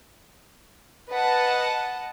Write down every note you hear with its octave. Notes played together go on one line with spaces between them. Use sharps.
B4 D#5 F#5 A5